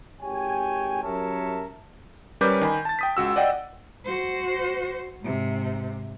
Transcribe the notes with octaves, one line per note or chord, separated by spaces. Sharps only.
G#1 G4 C#5 G5 G#5
F#2 G4 A#4 C#5 E5 A5
G3 C#4 A#4 B4 D6 G6
D#3 G#5 B5
A5 A6
G5 D#6 B6
C#2 F#4 E6
D5 D#5 F#5 G5
F#4 C5
G#2 C3